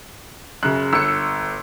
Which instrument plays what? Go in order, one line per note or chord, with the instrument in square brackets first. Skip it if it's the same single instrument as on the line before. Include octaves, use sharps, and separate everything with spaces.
[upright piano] F#2 C#3 [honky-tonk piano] F#6
[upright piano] G1 [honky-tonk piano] E6 C#7